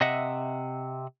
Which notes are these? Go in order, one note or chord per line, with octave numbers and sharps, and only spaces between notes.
C3 D#5 E5 F#5